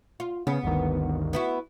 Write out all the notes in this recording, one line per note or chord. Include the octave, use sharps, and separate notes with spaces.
F4
C#3 B3
G1 D2 D#3
B3 E4 F#4